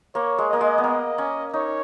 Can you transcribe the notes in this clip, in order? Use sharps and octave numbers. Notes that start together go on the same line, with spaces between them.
A#3 C#5
G#3
A#3 D#5
G#3
B3
A#3 D#5
C#4
D#4 C#5